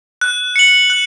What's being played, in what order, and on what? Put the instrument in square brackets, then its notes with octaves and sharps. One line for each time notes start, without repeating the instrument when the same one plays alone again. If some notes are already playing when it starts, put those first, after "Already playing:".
[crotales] F#6
C#7 F#7
F#6